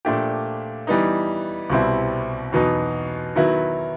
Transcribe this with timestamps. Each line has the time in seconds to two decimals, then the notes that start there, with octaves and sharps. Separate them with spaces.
0.05 A#2 F3 A3 D4 G4
0.87 E3 G3 B3 D#4
1.70 C2 B2 G3 C4 E4
2.52 E2 B2 F#3 B3 D#4
3.35 D#3 F#3 B3 E4